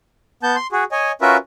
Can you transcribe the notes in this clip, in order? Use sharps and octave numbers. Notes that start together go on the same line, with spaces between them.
B3 A5 G6
C6
F#4 G#4
C#5 D#5 G#5
C#4 F4 F#4 A#4 B4 E5